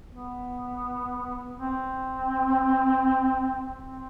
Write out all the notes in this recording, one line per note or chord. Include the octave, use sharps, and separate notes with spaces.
B3
C4
C4